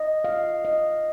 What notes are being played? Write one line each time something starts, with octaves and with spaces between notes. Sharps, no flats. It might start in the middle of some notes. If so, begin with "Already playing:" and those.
Already playing: D#5
F5
D#5